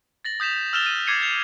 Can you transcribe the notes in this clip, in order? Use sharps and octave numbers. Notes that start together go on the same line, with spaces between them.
A6 A#6 F#7
D#6 G6 B6 E7 F7
E6 F6 A6 E7 F7 G7
D#7
D6 G#6 A6 C7 C#7 D#7
G6 C7 C#7 F7